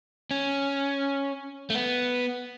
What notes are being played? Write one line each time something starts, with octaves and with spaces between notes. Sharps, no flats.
C#4
A3
B3